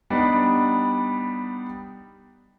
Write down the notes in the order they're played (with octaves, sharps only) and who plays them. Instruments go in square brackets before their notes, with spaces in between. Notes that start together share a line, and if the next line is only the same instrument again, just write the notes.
[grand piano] G3 B3 D4 D#4